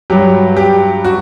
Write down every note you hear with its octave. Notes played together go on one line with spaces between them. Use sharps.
G2 F#3 G4
G4
F#4